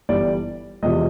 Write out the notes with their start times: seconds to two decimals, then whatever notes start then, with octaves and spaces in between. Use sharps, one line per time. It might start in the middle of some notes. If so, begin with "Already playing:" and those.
0.09 G1 G2 E3 G3 D5
0.82 E1 E2 C3 F3 D#5